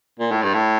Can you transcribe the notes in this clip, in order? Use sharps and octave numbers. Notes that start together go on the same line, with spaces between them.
A#2
A2
G2
A2